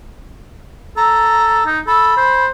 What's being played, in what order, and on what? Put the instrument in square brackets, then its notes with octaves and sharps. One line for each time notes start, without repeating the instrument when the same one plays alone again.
[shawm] A4 [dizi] A#5
[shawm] D#4
[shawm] A4 [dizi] B5
[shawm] C5